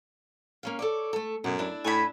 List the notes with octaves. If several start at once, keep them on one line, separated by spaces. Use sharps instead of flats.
A#3 C#4 F5
A4 C#5 D5
A3 A4
F#2 B2
D4 E4
A2 G#5 B5